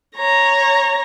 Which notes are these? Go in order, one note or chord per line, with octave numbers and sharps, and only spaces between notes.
C#5 A#5